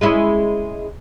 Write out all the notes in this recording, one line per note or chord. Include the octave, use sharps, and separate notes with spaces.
G#3 C#4 E4